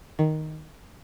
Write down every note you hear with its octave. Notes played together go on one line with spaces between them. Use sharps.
D#3